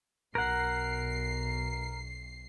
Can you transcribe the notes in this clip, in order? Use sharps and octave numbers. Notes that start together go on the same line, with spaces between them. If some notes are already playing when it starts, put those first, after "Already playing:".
B1 A#4 F#5 C7